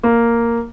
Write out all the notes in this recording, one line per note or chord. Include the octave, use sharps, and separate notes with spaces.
A#3